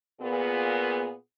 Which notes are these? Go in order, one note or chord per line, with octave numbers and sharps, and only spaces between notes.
A#2 B3 G#4